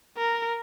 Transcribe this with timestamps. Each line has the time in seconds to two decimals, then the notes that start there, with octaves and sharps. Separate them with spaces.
0.17 A#4